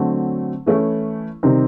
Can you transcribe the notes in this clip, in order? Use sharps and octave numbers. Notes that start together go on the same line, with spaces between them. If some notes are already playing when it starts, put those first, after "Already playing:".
Already playing: D3 F#3 A3 C4
E3 A3 C#4 E4
C3 D#3 G3 C4 D#4